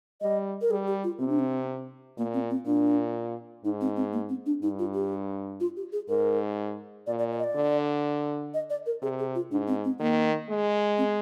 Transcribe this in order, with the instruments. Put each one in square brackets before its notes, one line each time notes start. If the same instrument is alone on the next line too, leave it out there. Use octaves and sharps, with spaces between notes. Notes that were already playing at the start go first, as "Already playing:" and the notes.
[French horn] G3 [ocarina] D#5
[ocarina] A#4
[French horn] G3 [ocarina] G#4
[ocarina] G4
F4
[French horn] C3 [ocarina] C4
[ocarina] D4
C4
[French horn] A#2 [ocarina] A#3
[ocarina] C4
C4
[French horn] A#2 [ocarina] D4
[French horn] G#2 [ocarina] D#4
[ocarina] C4
C4
A#3
C4
D4
[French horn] G2 [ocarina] D#4
[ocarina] F4
G4
F4
G4
G#4
[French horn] G#2 [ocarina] A#4
[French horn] A#2 [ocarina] D5
[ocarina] D5
D5
D#5
D5
[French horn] D3
[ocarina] D#5
D5
A#4
[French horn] C3 [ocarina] G#4
[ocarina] G#4
F4
[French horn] G#2 [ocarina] D4
[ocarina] C4
C4
[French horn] D#3 [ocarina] A#3
[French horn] G#3
[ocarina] C4